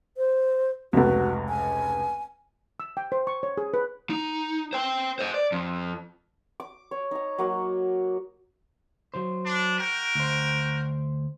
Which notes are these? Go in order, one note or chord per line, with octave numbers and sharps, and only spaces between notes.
C5
F1 C#2 F#4
G#5
E6
G5
C5
C#6
C#5
G#4
B4
D#4
C5 G5
C5 D#5
D5
F2
D6
C#5
D#4 A#5
F#3 A#3 F#4
F#3 C5
D4
F#4 A#4 G5
D2 C5